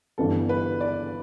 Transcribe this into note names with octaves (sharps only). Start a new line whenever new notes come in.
G1 G2 E3 B3 A4
B4
D5